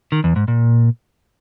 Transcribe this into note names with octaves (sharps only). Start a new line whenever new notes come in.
D#3
E2
G#2
A#2